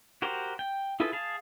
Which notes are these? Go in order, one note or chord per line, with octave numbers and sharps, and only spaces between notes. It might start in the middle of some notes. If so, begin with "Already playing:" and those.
F#4 G4 A#4 C5
G5
E4 F4 G#4 A4 B4
G#4 F5 A5